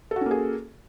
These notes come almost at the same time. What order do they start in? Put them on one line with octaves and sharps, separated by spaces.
A4 F#4 C#4 A#3 G#4